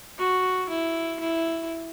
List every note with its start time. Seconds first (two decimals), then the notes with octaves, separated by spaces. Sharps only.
0.19 F#4
0.69 E4
1.20 E4